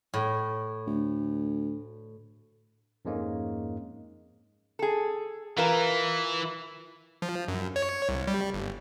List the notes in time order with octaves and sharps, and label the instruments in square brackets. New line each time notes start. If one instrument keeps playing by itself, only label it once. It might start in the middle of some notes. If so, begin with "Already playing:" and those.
[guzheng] A2
[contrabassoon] D2
[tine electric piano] F2 G#2 G#3 A#3 C#4
[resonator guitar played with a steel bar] G#4 A4
[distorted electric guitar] E3 [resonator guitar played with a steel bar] F4 A#4 B4
[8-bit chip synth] F3
F#2
C#5
C2
G3
G1